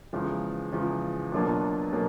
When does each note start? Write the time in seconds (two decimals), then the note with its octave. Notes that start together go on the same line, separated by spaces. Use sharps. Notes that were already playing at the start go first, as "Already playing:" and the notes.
0.13 E2 C#3 F3 G#3
0.73 E2 C#3 F3 G#3
1.32 B2 F#3 A#3 D4 F4
1.93 B2 F#3 A#3